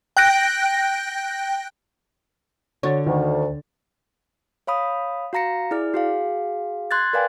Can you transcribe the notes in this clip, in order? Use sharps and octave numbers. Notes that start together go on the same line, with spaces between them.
G5 F#6 G6 A#6 D7
D3 F#4 C#5 A6
D2 D#3
C#5 F5 B5 D#6
F#4 F5 A#5 A#6 C#7
E4 G#4 D5 F6
F#4 G#4 F5
C6 F#6 G#6 A6
A#4 B4 D5 F5 G5 G#5